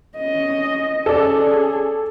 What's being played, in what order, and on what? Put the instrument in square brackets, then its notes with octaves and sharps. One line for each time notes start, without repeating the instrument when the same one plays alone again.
[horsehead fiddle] C#4 D#5
[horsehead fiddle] C#4 G#4 [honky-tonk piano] A4 D5